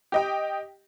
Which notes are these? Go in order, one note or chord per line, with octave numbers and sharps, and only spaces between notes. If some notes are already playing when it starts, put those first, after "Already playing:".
G4 D#5 G5